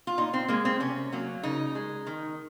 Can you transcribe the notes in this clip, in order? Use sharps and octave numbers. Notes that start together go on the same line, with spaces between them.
F4
A#2 D#4
C4
G#3 A#3
C4
C3 C#4
F#3 A#3
C#3 D#4
G#3
D#3